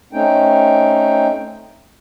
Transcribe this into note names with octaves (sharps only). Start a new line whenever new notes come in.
A3 C4 C#4 D#4 G5